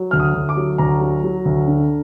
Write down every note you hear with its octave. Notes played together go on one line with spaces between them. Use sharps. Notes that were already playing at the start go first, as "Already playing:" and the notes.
Already playing: F#3
D2 F6
D#6
D2
D6
F#3
D2 A#5
F#3
F#3
D2
D3